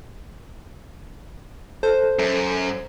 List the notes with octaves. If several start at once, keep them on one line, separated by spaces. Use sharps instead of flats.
A4 C5
F#2